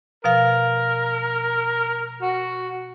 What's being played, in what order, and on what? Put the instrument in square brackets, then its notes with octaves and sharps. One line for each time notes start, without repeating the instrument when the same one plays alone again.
[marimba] B2 F3 F5 [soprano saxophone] A#4
[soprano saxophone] F#4